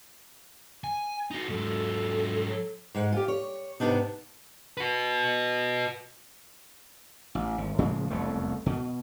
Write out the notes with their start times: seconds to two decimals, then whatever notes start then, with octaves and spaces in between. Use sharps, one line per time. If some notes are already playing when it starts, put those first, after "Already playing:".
0.84 G#5
1.31 D#4 F#4
1.49 G#2 F#3 A4
2.95 G#2 G#3 F#5
3.12 F4 G4
3.28 C#5
3.80 G#2 C3 G#3 B3 D4 D#4
4.77 F#4 B4
7.35 A1
7.58 G#1
7.78 A2 C#3 F3 G#3
8.10 E1 C2 F2 A3
8.66 B2